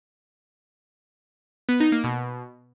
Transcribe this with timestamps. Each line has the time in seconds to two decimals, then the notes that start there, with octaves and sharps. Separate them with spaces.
1.69 B3
1.80 D#4
1.92 A#3
2.04 B2